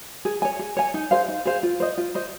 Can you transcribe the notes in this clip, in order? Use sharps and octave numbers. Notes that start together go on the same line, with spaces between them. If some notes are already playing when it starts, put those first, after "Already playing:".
G#4
C#5 G#5
G#4
C#5 G#5
D#4
G#4 C5 F5
D#4
G#4 C5 F5
F4
C5 D#5
F4
C5 D#5